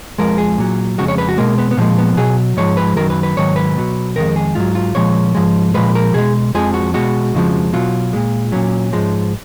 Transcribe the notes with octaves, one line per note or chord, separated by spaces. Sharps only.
F2 F3 G#3 A#4
G#4
A#2 F#3
F2 C#3 G#3 F#4
C#5
B4
F#4
B2 G#3 A#3
B3
B3
A#2 F3 G#3 A#3
B3
B2 F#3 G#4
G#2 F3 G#3 C#5
B4
F#2 D#3 F#3 A#4
B4
B4
G#2 D#3 F#3 C#5
B4
B2 F#3
F2 D#3 G#3 A#4
G#4
G#2 F#3 F4
F4
A#2 F3 G#3 C#5
G#2 F3 G#3
A#2 F3 G#3 B4
A#4
B2 G#3 G#4
F2 F3 G#3 G#4
F#4
B2 G#3 F#4
F2 C#3 F3 G#3
B2 F#3 F4
A#2 G#3
A#2 F#3 C#4
G#2 F3 G#3